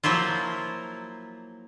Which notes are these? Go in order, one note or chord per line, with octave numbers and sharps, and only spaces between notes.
F3 F#3 A#3 E4 F4